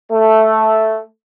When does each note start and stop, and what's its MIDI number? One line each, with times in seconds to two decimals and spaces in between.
0.12 1.02 57